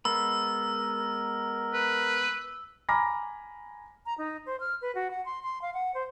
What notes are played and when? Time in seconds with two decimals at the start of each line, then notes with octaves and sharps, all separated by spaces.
0.05 G#3 B3 A#4 B5 E6
1.73 B4
2.89 G#5 A#5 B5 D6 F6 A#6
4.06 A#5
4.18 D#4
4.46 C5
4.60 F6
4.82 B4
4.95 F#4
5.11 F#5
5.25 C6
5.43 C6
5.62 F5
5.74 F#5
5.95 C5